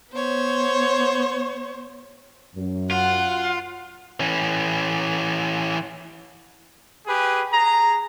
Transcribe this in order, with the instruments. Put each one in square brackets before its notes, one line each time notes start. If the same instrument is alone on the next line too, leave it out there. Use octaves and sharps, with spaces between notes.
[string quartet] B3 C5 C#5
[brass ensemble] F#2
[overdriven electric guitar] F4 [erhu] F#5
[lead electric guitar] E3 C#4
[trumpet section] G4 G#4 B4
G#4 A#5